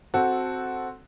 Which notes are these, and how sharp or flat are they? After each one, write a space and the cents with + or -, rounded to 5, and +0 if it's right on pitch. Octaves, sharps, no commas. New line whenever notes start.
C4 +0 F#4 +0 A4 -5